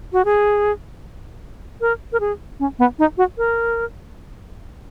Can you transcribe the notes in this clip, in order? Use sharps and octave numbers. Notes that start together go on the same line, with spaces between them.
F#4
G#4
A#4
A#4
G#4
C#4
B3
D#4
F#4
A#4